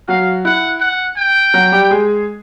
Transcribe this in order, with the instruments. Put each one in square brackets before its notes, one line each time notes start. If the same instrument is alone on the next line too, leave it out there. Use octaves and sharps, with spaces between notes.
[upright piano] F#3 F#4 [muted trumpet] F5
[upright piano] E4 [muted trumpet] F#5
[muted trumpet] F#5
G5
[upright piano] F#3 F#4
G3 G4
G#3 G#4